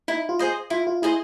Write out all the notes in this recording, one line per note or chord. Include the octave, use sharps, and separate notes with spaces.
D#4 E4
F4
G#4 C5 D#5
E4 F4
F4
E4 G#4 C5 D#5